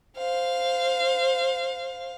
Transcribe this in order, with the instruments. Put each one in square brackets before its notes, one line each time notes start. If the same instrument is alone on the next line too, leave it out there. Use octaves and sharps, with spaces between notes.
[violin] C5 F5